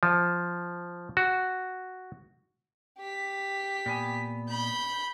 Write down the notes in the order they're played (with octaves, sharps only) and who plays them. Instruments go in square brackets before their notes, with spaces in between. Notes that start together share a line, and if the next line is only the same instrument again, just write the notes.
[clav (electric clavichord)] F3
F#4
[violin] G4 B6
[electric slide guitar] A#2 B3 G#5
[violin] B5 G6